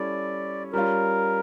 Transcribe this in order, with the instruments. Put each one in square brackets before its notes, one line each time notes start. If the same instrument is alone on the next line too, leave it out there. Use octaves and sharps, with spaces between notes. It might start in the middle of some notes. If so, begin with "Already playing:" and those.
Already playing: [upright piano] G3 C#4 E4 A4 C#5 [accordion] D5
[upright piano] G3 C#4 F4 [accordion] A#4